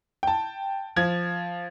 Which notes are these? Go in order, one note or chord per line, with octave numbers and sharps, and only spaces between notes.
G5 A5
F3 G#6